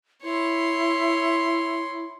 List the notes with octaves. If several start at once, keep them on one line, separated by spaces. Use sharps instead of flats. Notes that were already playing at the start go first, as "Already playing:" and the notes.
E4 C#5 C6